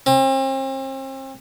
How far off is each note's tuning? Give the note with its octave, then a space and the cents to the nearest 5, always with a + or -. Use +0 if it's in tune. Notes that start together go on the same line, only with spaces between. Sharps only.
C4 +40